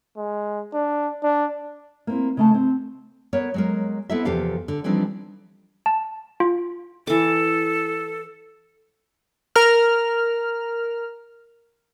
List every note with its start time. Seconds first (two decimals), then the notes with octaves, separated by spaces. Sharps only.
0.17 G#3
0.74 D4
1.23 D4
2.07 A#3 C4 E4
2.37 C#3 A3 A5
2.54 C4
3.33 B3 A#4 C#5
3.54 F#3 G#3 A#4
4.10 B3 C4 E4 A4 E5
4.25 E2 C3 F3 G4 A4 F5
4.68 D3
4.84 E3 F3 G3 C4 D4 D#4
5.86 A5
6.40 F4
7.07 E3 A4 D6
9.56 A#4 F6